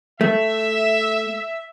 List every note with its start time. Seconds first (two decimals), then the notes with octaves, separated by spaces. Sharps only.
0.21 A3 E5